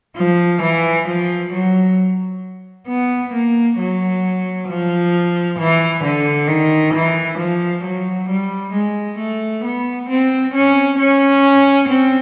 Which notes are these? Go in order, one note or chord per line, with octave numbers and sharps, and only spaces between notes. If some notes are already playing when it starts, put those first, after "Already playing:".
F3
E3
F3
F#3
B3
A#3
F#3
F3
E3
D3
D#3
E3
F3
F#3
G3
G#3
A3
B3
C4
C#4
C#4
C4